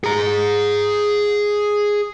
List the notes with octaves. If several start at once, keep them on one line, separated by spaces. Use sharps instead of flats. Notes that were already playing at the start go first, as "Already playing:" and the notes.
G#4 A#5